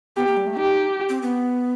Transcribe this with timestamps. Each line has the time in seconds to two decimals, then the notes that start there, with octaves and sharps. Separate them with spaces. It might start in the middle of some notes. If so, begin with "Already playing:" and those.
0.16 B3 G4
0.27 A#3
0.37 G3
0.47 A3
0.56 D#4 G4
1.09 C4
1.22 B3